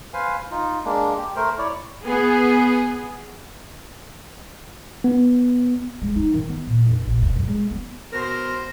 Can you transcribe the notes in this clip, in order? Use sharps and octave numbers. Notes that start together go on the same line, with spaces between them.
B4 C5 F5 G#5
D#4 F4
G#3 A#3 D4
G4
A3 A#4 C5
E4 C#5 D5
B3 G#4
B3
G#3
D#4
D#3
B3
A#2
F1
A#1
B2
F#2
G#3
B3
B2 A#4 C5 C6 A#6